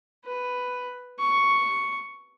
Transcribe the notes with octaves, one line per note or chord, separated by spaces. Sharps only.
B4
C#6